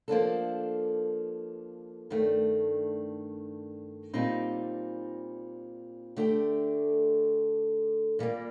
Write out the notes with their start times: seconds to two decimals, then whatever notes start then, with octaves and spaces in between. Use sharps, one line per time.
0.08 F3 A#3 D4 A4
2.10 G2 D#3 A3 D4
4.14 A#2 G3 C4 D#4
6.16 D3 A3 D4 G4
8.19 A#2 G3 A#3